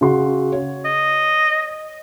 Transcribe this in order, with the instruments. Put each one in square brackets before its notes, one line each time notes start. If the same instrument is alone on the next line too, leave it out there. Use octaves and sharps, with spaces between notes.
[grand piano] C#3 F#4 C6
C#5
[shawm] D#5